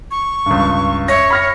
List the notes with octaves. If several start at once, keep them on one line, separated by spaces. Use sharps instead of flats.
C#6
C#2 G2
C#5 E5 A#6
B5 F6 A#6